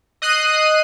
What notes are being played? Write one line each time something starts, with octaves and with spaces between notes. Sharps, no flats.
D#5 D#6 F#6 C7 D#7